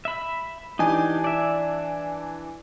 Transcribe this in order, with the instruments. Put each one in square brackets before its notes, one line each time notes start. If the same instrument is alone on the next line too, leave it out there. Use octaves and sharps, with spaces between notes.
[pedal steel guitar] E5 B5
[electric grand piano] E3 D4 G#5 [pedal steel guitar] D#4 G4
[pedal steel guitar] D5 E5